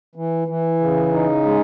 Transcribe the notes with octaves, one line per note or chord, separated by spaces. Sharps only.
E3
E3
C#3
D#4
G#3